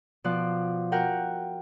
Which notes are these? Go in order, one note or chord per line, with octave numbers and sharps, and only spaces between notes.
B2 F3 D5 C6 F#6
F#4 A#4 F#5 G5